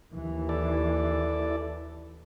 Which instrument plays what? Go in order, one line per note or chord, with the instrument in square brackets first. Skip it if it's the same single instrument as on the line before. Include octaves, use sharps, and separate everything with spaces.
[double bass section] D#2 E3
[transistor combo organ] E4 A4 D5